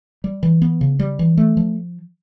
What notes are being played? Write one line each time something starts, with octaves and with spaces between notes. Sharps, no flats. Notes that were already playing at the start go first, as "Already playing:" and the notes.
G3
E3
B3
C#3
G3
E3
A3
F3